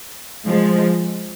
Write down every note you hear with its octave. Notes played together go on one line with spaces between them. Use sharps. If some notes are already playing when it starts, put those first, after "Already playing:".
F3 G#3